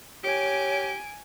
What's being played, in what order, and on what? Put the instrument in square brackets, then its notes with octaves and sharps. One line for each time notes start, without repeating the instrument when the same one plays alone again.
[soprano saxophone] G4 [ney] C#5 [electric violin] G#5 D7